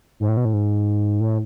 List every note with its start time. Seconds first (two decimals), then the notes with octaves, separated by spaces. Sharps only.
0.20 G#2
0.29 A2
0.37 B2
0.45 A2
0.53 G#2
1.20 A2